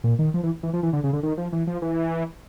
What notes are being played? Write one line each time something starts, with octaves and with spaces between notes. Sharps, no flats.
A#2
D#3
F3
E3
E3
F3
E3
D3
C#3
D3
D#3
F3
E3
F3
E3